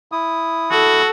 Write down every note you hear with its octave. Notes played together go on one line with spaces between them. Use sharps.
E4 D#6
F#4 A4